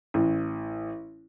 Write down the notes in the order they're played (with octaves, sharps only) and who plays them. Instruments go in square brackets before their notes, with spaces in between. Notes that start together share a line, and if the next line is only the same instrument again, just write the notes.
[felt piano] A1